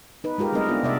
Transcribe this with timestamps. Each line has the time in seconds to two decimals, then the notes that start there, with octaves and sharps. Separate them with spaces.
0.24 D#4 B4
0.38 G#3 F4 G4 A#4
0.52 G3 A3 C4 D#4 A#4 D#5
0.68 B3 D4 F4
0.83 C3 D5 E5